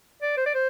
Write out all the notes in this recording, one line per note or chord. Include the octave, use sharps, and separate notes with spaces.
D5
C5
D5
C5